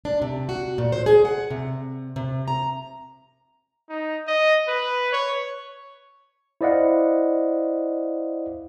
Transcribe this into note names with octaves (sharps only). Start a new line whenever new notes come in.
D4
C3
F#4
A#2
C5
G#4
F#5
C3
C3
A#5
D#4
D#5
B4
C#5
E4 C5 D5 D#5 F5 F#5